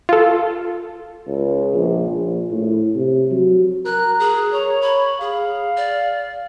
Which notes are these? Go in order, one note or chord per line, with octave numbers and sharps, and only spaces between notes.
F4 A4
C#2
A#1
A#1
A2
C3
F#3
A#4 F#6
G#4
C#5 A#5
B5
G#4 F5
D5